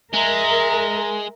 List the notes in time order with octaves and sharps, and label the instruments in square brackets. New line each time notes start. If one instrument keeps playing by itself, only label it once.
[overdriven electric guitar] G#3 [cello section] A#4 [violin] E5 A#5